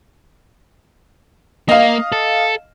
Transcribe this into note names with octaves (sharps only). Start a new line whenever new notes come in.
A#3 D#5 F5
A4